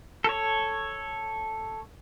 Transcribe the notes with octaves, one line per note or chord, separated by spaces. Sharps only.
A4 C#5